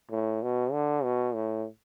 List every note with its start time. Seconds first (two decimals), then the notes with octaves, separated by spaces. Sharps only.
0.11 A2
0.42 B2
0.72 D3
1.04 B2
1.34 A2